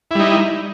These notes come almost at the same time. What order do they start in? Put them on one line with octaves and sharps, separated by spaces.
E4 G3 D#4